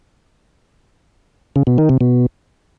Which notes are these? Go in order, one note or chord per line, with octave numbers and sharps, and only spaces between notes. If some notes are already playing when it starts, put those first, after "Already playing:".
C#3
B2
D#3
C3
B2